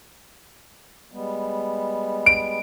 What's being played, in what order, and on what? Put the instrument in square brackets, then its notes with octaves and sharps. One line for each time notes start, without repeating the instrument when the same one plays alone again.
[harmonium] G3 G#3 B3
[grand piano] D7